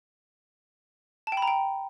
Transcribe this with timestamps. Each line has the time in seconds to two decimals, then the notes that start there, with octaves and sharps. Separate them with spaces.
1.27 A5
1.32 G5
1.37 B5
1.42 A#5
1.47 G5